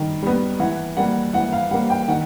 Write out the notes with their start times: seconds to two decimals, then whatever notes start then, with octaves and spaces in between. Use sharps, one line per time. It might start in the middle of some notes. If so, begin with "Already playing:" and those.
Already playing: D#3 G3
0.23 G3 B3
0.59 E3 F#5
0.97 G3 A#3 F#5
1.33 E3 F#5
1.53 F5
1.71 G3 A#3 F#5
1.90 G5
2.08 D#3 F#5